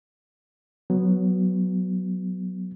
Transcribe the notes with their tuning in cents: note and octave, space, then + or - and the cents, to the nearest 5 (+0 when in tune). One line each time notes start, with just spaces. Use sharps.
F#3 +0 B3 +0